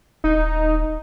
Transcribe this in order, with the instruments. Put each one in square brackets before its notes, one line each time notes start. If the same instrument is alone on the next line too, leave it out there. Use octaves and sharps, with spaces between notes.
[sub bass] D#1 [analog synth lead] D#4